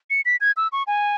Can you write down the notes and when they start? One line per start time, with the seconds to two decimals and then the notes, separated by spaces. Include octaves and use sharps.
0.10 C#7
0.25 B6
0.41 G#6
0.57 E6
0.72 C#6
0.87 G#5